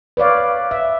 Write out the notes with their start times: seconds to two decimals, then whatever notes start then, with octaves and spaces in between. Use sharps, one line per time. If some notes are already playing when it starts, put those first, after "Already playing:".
0.17 B4 C#5 D5 F5
0.71 E5